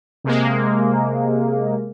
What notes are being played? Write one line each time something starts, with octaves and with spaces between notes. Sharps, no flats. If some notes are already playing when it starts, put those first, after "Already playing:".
C3 G#3 A#3